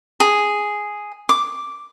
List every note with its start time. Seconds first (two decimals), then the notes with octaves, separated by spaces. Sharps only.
0.20 G#4
1.29 D6